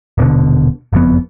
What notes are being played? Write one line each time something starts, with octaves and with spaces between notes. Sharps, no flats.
D#1 B2 D3
F#1 F2 B3